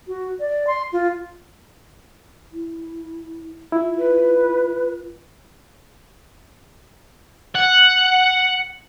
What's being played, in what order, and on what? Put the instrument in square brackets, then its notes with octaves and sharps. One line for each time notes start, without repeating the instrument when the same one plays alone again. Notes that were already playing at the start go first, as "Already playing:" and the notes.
[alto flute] F#4
D5
C6
F4
[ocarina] E4
[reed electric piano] E4 [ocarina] F4
[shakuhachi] B4
[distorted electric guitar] F#5